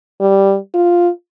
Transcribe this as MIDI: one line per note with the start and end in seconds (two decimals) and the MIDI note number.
0.21 0.58 55
0.75 1.10 65